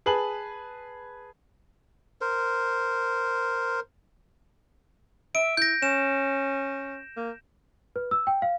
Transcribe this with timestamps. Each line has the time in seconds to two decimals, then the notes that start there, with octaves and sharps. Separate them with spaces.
0.06 G#4 B4 A5 F#7
2.21 A#4 C5
5.35 E5 D7
5.57 E4 G6 A#6
5.82 C#4 E7
7.17 A#3
7.96 B4
8.11 E6
8.27 G5
8.42 F5